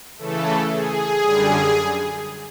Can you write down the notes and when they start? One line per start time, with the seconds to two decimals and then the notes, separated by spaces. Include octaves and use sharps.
0.18 C#3 E3 A3 A4
0.69 G#4
1.21 F#2 D3 G3